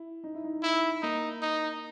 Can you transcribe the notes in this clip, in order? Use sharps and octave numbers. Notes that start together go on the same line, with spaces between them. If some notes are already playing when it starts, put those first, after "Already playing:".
Already playing: E4
D#4
E4
D#4
E4
A#3 D#4
D#4